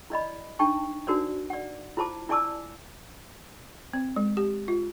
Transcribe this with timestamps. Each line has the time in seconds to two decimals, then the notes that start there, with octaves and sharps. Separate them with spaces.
0.10 E4 D5 D#5 B5
0.59 D4 D#4 G5 A5 C#6
1.07 D4 D#4 F#4 A#4 C5 D5
1.50 D5 F#5
1.97 E4 F4 C5 A5 D6
2.29 E4 D5 G#5 A5 D6 E6
3.93 C4
4.16 G#3
4.37 G4
4.68 F4